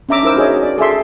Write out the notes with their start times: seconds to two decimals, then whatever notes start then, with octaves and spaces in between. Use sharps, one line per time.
0.09 C#4 D4 E5 A#5 D6 E6
0.23 D#4 E4 A#4 C5 E6
0.36 F#4 G#4 C#5 D#5
0.63 D5
0.78 G#4 A4 E5 C6